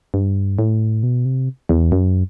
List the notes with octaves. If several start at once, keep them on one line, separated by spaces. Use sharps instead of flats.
G2
A2
B2
C3
E2
F#2